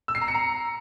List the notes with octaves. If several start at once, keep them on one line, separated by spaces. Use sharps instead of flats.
E6
C7
A#5
C#7
A#5